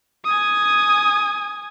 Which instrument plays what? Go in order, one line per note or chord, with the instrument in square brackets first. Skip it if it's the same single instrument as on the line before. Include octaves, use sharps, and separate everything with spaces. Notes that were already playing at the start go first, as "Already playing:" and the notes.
[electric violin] G#5 D#6